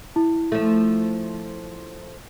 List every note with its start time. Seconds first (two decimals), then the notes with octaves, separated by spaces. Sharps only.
0.16 E4
0.52 F3 A3